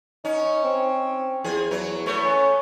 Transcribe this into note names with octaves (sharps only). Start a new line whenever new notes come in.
C#4 D#4
C4
E2 F3 G#4
E2 F#3
A3 B3 C#5
C#4